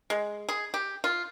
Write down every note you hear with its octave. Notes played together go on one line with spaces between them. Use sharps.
G#3
G#4
G4
F4